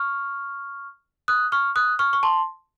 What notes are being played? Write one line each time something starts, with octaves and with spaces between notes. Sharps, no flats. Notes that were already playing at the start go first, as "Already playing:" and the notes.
Already playing: C#6 F6
D#6 F#6
C#6 F6
D#6 F#6
C#6 F6
C#6
A5 C6